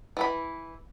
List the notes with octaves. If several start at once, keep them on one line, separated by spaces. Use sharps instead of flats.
E3 E4 B5